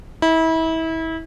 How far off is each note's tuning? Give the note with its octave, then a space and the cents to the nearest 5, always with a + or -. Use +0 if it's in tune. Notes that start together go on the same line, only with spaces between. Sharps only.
E4 -30